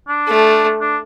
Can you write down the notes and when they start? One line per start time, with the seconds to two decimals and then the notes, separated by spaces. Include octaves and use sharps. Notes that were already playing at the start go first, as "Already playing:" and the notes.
0.08 D4
0.28 A3
0.81 D4